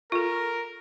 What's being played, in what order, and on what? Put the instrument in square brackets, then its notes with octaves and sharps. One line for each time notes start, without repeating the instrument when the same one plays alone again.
[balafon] F4 A4 [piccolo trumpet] A#4